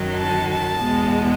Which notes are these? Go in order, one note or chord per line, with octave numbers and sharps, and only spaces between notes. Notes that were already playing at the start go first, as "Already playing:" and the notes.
Already playing: F#2 D#3 F#3
A5
A5
E2 B2 G#3